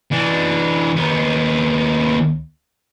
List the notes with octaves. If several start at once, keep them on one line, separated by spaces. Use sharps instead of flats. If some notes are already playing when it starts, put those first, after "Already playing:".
E3 D4
D#2 B3